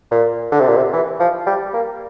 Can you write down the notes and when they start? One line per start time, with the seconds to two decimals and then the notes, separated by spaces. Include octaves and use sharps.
0.11 A#2
0.52 D3
0.60 C3
0.68 A#2
0.76 C3
0.93 E3
1.19 F3
1.47 G3
1.73 A#3